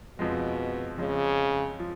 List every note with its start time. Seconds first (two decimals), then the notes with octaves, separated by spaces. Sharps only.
0.19 F2 B2 F3 G#3
0.98 F2 C#3 F3 G#3
1.79 F3